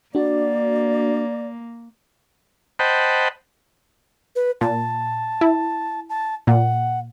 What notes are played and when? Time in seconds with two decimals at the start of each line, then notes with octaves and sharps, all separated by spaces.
0.15 A#3 D4 F#4 D5
2.79 C5 D#5 F#5 G5 A5 B5
4.36 B4
4.61 A#2 A5
5.41 E4
6.09 A5
6.47 A#2 F#5